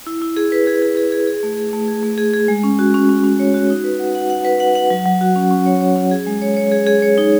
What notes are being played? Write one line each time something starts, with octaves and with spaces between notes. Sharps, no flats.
E4
E4
G#4
B4
G#4
G#4
G#4
G#4
G#4
A3
G#4
A3
G#4
A3
G#4
G#4
G#3
C#4
F#4
C#4
C#4
C#4
C#5
F#4
D#4
B4
F#5
F#5
F#5
B4
F#5
F#5
F#3
F#3
F#4
C#4
C#4
C#5
C#5
C#4
G#4
G#3
C#5
C#5
G#4
G#4
C#5
D#4